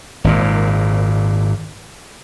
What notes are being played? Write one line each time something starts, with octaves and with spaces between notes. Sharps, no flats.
G#1 A#2